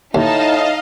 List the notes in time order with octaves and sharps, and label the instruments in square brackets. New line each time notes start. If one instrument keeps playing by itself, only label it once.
[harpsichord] D#2 [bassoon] A2 [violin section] D#4 A5 [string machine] D#5 F5